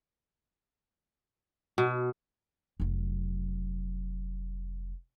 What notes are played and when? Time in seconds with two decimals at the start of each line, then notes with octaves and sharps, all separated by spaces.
1.78 B2
2.80 F1 F#3